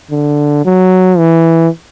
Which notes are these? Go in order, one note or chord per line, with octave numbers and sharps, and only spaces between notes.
D3
F#3
E3